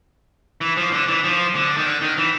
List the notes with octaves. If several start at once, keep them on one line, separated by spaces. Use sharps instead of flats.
E3
F3
D3
E3
F3
D3
D#3
D3
D#3
E3